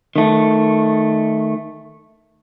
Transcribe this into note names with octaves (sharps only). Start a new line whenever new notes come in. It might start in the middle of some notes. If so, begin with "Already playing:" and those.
D#3 A3